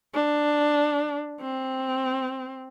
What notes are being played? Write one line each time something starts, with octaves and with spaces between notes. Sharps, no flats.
D4
C4